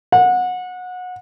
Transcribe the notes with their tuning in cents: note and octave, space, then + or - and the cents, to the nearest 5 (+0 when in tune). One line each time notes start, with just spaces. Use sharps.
F#5 -25